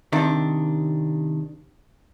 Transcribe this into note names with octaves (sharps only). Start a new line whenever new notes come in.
C3 D#3 D4